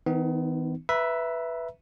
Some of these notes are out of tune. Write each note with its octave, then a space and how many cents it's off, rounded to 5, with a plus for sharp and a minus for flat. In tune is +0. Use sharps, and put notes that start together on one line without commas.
E3 -45 B3 +35 D#4 +0
B4 +0 E5 +5 A#5 +40